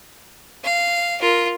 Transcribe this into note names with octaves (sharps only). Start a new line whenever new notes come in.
F5
F4 A#4